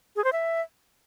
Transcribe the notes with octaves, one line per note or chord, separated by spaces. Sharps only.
G#4
C5
E5